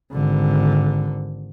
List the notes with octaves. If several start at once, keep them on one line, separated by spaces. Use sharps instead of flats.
G#1 D3